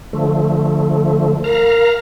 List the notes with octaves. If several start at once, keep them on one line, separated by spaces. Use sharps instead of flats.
D3 F3 A3
A#4 F5 A#5